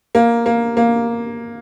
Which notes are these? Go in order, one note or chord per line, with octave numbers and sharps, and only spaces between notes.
A#3
A#3
A#3